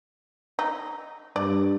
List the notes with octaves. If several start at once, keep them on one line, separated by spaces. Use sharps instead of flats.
D#4
G2 D5